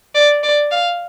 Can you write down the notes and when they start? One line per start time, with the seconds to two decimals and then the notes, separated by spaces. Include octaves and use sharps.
0.15 D5
0.43 D5
0.72 F5